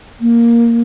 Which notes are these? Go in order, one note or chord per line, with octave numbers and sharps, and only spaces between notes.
A#3